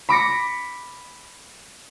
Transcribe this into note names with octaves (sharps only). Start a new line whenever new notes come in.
B5 D6 A#6 C#7